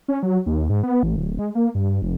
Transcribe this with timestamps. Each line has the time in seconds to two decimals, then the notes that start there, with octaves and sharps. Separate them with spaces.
0.08 C#4
0.23 F#3
0.46 D#2
0.69 G#2
0.83 B3
1.03 A1
1.16 D1
1.39 G#3
1.55 A#3
1.75 G2
2.02 F1